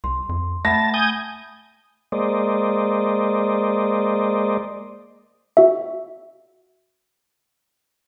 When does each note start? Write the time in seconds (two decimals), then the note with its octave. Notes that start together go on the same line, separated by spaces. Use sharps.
0.04 C2 C6
0.29 F2
0.65 A3 E5 F#5 A5 B5 A#6
0.94 G#5 D#6 G6
2.12 G#3 A#3 C5 D5 D#5
5.57 F#4 E5